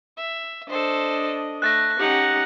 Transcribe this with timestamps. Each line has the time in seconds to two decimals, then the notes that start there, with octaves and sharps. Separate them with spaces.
0.17 E5
0.69 D4 A4 C5 D#5
1.62 A3 F#6 A6 A#6
1.99 C#4 D#4 G4 F#5